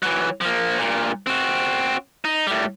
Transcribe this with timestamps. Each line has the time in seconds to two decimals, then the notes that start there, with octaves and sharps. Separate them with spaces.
0.03 E3 F#3
0.41 F3 A#3
0.79 G2 A#2
1.27 C4 F#4
2.25 D#4
2.47 A2 G3